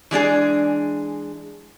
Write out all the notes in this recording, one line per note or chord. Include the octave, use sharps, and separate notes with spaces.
E3 G#3 D4 G#4